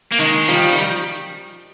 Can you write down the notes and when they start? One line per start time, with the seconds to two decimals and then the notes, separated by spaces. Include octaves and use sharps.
0.12 A#3
0.19 D#3 G#3
0.48 F3 G3
0.73 D#3